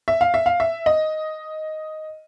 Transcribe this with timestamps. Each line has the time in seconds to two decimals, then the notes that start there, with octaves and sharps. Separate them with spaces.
0.08 E5
0.21 F5
0.34 E5
0.46 F5
0.60 E5
0.86 D#5